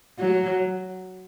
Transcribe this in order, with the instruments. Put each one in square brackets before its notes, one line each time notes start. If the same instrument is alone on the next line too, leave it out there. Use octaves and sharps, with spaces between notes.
[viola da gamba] F#3